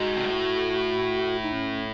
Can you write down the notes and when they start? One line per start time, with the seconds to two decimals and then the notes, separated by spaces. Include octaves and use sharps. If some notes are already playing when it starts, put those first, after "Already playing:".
Already playing: G#2 F#4
0.16 C3
0.25 A2
1.43 D#4
1.53 C#4